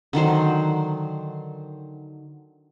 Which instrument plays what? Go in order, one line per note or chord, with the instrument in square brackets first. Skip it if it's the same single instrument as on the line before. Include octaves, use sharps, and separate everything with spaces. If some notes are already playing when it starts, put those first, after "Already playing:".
[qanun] D3 D#3 F#3 C5